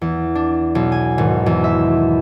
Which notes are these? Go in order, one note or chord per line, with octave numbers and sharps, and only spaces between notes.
E2
D4
B1
G#5
G#1
E2
E5